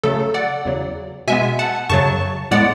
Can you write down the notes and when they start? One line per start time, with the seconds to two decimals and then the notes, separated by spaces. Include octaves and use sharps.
0.04 C#3 F#3 A3 A4
0.34 D5 F#5
0.65 E2 C#3 F#3
1.28 B2 G#3 B3 E5 G#5
1.59 F#5 A5
1.89 F#2 C#3 F#3 A5 C#6
2.51 A2 G#3 B3 D5 F#5